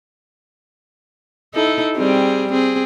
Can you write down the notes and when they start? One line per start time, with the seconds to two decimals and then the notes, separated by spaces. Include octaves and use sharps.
1.55 D#4 E4 A4
1.96 G3 C4 G#4
2.52 C4 G#4